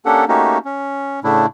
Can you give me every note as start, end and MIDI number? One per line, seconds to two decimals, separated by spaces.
0.05 0.25 58
0.05 0.25 61
0.05 0.25 62
0.05 0.25 67
0.05 0.25 69
0.05 0.25 78
0.28 0.58 57
0.28 0.58 58
0.28 0.58 61
0.28 0.58 63
0.28 0.58 66
0.28 0.58 67
0.65 1.20 61
1.24 1.46 45
1.24 1.46 49
1.24 1.46 57
1.24 1.46 62
1.24 1.46 64